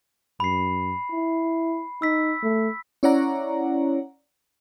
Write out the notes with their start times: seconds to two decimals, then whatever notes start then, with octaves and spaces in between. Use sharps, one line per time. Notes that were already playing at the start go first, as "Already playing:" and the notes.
0.40 F#2 B5 C7
1.11 E4
2.02 D#4 E6 B6
2.43 A3
3.03 C#4 E4 C#5 D5 F#5 A#5